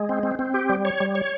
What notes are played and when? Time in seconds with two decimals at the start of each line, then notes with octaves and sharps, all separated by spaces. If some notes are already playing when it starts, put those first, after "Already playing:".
Already playing: G#3
0.09 C4
0.23 C4
0.39 C4
0.54 G4
0.69 G3
0.85 C#5
1.00 G3
1.15 C#5